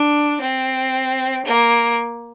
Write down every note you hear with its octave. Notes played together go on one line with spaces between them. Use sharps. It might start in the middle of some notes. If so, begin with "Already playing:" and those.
Already playing: D4
C4
A#3